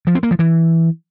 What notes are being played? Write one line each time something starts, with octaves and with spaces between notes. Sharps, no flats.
F3
C4
A#3
F3
E3